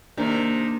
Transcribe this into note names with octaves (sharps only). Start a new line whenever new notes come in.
C3 D#3 A#3 D4